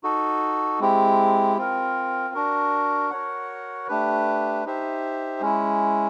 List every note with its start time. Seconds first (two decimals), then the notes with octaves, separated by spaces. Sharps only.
0.03 D#4 F#4 A4
0.80 G#3 C4 E4 G4
1.57 C4 F4 A#4
2.34 D4 F#4 A#4
3.10 F#4 A#4 C#5 F#5
3.88 A3 D4 G4 B4
4.65 D#4 G4 C5 E5
5.41 G#3 C#4 E4